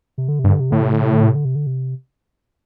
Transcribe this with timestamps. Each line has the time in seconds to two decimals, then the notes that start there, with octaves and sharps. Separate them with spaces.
0.18 C3
0.28 D3
0.39 C3
0.44 G2
0.49 D3
0.60 C3
0.71 A2 D3
0.82 C3
0.93 D3
1.03 C3
1.13 D3
1.24 C3
1.35 D3
1.45 C3
1.55 D3
1.67 C3